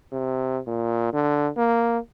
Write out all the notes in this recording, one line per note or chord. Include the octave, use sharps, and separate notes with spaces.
C3
A#2
D3
A#3